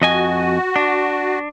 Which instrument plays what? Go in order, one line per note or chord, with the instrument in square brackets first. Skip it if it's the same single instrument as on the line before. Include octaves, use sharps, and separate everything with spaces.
[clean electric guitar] F2 D#5 G#5 [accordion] F#4
[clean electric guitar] D4